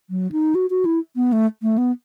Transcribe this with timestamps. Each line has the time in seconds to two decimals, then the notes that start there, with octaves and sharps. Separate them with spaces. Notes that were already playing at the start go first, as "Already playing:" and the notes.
0.10 F#3
0.32 D#4
0.55 F#4
0.70 F#4
0.85 E4
1.16 B3
1.32 A3
1.63 A3
1.78 B3